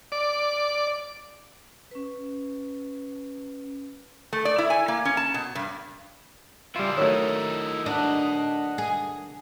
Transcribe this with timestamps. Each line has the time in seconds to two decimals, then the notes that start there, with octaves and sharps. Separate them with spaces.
0.12 D5
1.91 C#4 B4
4.33 A3
4.45 D5
4.58 E4
4.70 G#5
4.88 A#3
5.05 C#4
5.17 A5
5.34 B2
5.55 G2
6.76 C#3 G3 E4 F4
6.97 D#3 F#3 A3 D#4 E4 C#5 E6
7.86 D4 D#5 F#5
8.78 G#4